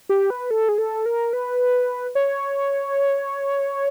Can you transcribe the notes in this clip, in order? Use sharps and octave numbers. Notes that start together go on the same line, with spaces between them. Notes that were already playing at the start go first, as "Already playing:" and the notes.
G4
B4
A4
G#4
A4
A#4
B4
C#5